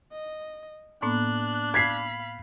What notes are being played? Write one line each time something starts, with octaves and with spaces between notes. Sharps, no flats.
D#5
A2 A#3 B3 D4 F#6
F5 B5 G#6 B6 C7